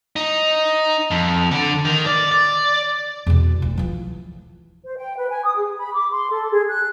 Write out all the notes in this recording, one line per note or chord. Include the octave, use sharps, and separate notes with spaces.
D#4
F2
D3
D#3
D5
D5
E2 B2
D2
E3 F3
C5
G5
B4
G#5
D#6
G#4
B5
D6
C6
A4
G#4
F#6